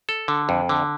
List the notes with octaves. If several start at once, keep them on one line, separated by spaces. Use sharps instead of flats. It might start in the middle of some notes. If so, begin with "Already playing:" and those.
A4
D3
F2
D3